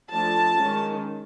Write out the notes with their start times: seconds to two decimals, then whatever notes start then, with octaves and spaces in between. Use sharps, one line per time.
0.10 F3 A3 D4 A5
0.57 D#3 G#3 C#4